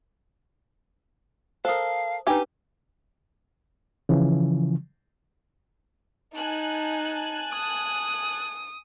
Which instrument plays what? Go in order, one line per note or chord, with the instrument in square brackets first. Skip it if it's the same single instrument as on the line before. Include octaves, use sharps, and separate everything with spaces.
[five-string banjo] A4 A#4 [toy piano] C5 D#6 [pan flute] F5
[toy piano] D4 B4 [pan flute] D#4 [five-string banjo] G4 G#5
[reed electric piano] C#3 E3 F3
[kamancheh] D#4 [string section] G#5 A5 F#6
[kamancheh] D#6